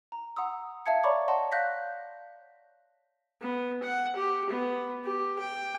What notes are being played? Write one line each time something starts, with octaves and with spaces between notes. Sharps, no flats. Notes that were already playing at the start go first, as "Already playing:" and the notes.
A#5
F#5 A#5 C6 D#6 E6
E5 F5 A5 G#6 C#7
C#5 D5 A#5 B5 C#6 D6
C#5 D#5 F#5 A5 C6
F5 F#6 G6 A#6 B6
B3
F#5
G4
B3
G4
G5